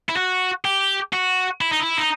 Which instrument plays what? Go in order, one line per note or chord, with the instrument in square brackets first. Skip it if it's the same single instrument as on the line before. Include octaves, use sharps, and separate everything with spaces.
[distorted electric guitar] E4
F#4
G4
F#4
E4
D#4
E4
D#4